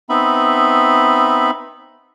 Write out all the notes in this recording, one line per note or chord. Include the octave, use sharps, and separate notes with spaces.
B3 C4 D#4 E5 B5